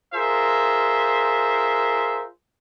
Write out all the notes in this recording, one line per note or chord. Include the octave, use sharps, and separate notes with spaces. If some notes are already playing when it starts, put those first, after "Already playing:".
F4 G#4 A#4 C5 E5